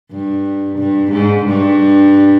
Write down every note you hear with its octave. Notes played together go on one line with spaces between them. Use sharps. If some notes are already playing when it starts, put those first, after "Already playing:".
G2
G2
G#2
G2